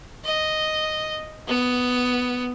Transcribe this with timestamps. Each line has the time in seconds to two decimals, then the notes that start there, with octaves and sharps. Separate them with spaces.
0.24 D#5
1.47 B3